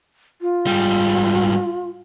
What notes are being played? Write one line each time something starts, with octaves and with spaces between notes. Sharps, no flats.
F4
G#2 G3